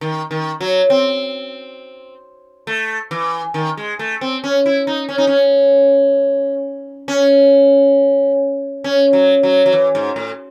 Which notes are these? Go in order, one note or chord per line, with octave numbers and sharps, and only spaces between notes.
D#3
D#3
F#3
C4
A3
E3
D#3
G#3
A3
C4
C#4
E4
D#4
C#4
D#4
C#4
C#4
C#4
F#3
F#3
F#3
E3
G#2
A2